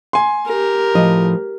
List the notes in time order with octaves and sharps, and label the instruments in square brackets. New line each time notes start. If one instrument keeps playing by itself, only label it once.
[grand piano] G#5 C6
[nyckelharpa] G4 A#4
[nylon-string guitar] A2 F3 D#5